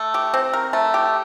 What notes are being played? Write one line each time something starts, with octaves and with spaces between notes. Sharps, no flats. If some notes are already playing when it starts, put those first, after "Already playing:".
Already playing: A3
G4
C4
A#4
A3
G4